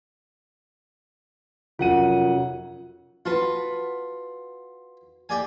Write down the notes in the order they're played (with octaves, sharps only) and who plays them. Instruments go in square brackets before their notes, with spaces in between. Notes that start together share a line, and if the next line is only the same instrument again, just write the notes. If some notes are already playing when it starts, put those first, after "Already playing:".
[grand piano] F1 F#5 D#7 [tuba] F#2 [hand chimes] F4
[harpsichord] F4 A5 [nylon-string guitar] F#4 B4
[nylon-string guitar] A#3 [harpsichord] G4 D5 G#5